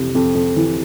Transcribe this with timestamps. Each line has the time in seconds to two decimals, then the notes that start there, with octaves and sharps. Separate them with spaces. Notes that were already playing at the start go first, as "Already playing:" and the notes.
Already playing: F2 C3 E3
0.15 F2
0.35 F2
0.57 E3